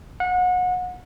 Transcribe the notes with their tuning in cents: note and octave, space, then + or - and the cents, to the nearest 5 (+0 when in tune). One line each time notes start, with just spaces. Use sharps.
F#5 -30